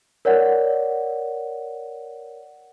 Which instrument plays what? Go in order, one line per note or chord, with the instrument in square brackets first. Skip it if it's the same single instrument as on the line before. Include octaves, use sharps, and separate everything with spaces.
[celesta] A#4 C#5 D5 F#5